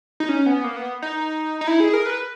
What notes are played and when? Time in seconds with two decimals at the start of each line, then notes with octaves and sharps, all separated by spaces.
0.20 D#4
0.29 C#4
0.46 B3
0.64 A#3
0.77 B3
1.02 D#4
1.61 D#4
1.67 E4
1.80 G#4
1.93 A#4
2.06 B4